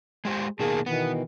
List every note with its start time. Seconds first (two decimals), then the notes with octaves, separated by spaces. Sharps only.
0.25 G#3 G4 C5
0.59 B2 D#3 A#3 G#4 A5
0.86 B2 D#3 E3 B3